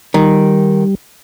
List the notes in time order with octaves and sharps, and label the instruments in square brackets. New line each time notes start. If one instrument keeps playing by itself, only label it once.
[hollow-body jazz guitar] D#3 [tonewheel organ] G3